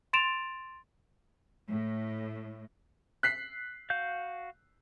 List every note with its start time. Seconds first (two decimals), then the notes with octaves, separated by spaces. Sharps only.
0.13 C6 A6 D7 E7 F7
1.70 A2
3.23 F#6 B6 C7
3.90 F#4 F5 G6